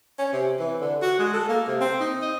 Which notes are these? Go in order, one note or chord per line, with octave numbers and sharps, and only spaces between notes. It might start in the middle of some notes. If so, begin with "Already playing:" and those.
C#4
C3
E3
D3
F#4
G#3
A4
A#3
C3
C4
D#4
D#5